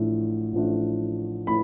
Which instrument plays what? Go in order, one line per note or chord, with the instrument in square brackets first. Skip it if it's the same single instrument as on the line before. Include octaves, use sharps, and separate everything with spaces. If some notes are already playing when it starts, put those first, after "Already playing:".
Already playing: [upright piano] A1 A2 F3 A3 D4
A1 A2 F3 A3 D4
A2 B5